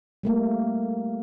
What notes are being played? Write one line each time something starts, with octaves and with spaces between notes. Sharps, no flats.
G3 A3 A#3